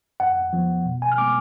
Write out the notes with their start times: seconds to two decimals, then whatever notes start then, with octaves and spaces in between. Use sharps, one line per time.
0.20 F2 F#5
0.53 F3 B3
0.85 B2
1.02 G#5
1.12 F6
1.18 G#3 B3 D6